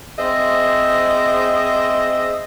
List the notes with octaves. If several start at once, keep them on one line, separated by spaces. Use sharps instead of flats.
C4 G#4 C5 D#5 E5